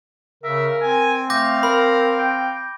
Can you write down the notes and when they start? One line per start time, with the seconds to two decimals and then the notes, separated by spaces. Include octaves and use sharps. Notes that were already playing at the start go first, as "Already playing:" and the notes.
0.44 C#3 A#4 E5
0.82 C4 G#5
1.30 A3 F5 D6 G6 A#6
1.63 A#4 B5
2.19 G5